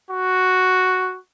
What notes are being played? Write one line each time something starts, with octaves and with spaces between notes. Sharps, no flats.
F#4